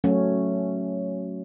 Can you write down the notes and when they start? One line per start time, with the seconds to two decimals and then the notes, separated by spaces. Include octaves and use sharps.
0.04 F#3 A3 C#4